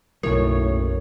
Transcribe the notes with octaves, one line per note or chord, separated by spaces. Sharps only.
B1 F#2 A2 C#3 F#3 A#4 C#5